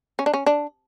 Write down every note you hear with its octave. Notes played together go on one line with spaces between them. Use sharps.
C#4
D4
C#4
D4